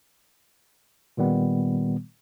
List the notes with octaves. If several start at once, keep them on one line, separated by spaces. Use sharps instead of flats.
A#2 D#3 G3 B3